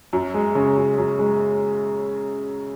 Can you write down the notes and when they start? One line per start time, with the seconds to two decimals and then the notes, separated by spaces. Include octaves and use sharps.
0.13 F#2
0.34 G#3
0.55 C#3
0.77 F#2
0.98 F#2
1.19 G#3